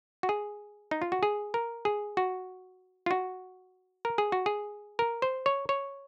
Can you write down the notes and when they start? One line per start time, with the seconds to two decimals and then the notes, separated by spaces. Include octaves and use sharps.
0.23 F#4
0.29 G#4
0.91 D#4
1.02 F4
1.12 F#4
1.23 G#4
1.54 A#4
1.85 G#4
2.17 F#4
3.06 F4
3.11 F#4
4.05 A#4
4.18 G#4
4.32 F#4
4.46 G#4
4.99 A#4
5.22 C5
5.46 C#5
5.69 C#5